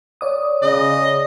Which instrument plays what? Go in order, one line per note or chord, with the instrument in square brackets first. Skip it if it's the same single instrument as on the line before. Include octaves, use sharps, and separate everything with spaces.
[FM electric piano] C#5 D5 D#6
[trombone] C#3 [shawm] D#5